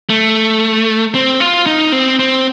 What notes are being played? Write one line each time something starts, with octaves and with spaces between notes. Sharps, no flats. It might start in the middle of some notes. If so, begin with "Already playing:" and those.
A3
C4
F4
D#4
C4
C4